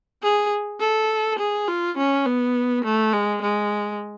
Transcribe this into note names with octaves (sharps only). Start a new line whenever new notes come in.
G#4
A4
G#4
F4
C#4
B3
A3
G#3
G#3